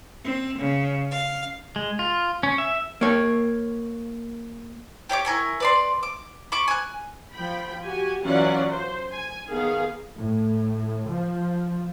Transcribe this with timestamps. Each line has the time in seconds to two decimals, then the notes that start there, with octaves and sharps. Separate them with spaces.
0.24 C4
0.58 C#3
1.11 F5
1.76 G#3
1.99 F4
2.43 C#4
2.58 E5
3.01 A#3 C#5
5.09 G4 C#5 B5 D6
5.25 E4 A#4 G#5 C#6
5.60 B4 D5 C6
6.03 D6
6.52 B5 C#6 D6
6.68 G#5 F#6
7.34 F3 G5 B5
7.84 F#4 G4 G#5
8.24 E3 F#3 C#4 F4 D5 F#5
8.67 C5
9.13 G#5
9.49 D#3 B3 G#4 F5
10.17 A2
11.11 F3